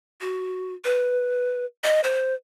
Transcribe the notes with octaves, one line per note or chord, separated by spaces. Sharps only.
F#4
B4
D#5
C5